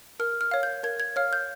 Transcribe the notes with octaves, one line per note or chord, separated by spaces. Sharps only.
A#4 F6
F6
C#5 F5
G6
A#4 G#6
G#6
C#5 F5 F6
G6